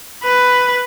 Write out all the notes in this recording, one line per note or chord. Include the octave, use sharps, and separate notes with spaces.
B4